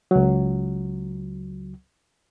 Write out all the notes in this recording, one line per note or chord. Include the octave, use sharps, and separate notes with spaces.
C#2 F#3